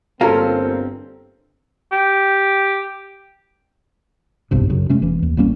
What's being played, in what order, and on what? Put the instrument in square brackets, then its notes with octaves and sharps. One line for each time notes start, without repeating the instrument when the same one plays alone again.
[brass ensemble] G1 G2 C4 [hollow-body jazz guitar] A#3 C#4 A#4 [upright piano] F4 A4
[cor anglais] G4
[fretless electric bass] F#1 B1 G2 C3
F#2 C#3
C3 G#3 A3 C#4
E1 E3
D#2
A1 G3 A#3 C#4